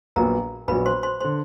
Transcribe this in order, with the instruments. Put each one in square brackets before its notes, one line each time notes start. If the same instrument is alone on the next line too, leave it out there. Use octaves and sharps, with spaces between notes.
[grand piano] A#1 A#2 F#3 B3 [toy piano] A#4 A#5
[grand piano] A#1 A#2 F#3 B3 [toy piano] B4 B5
[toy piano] C5 C6
C5 C6
[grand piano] D3 [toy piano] C5 C6